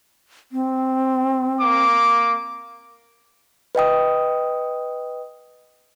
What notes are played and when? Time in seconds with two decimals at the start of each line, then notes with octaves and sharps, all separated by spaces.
0.52 C4
1.60 A#3 D6
3.75 B4 D#5 G5 D#6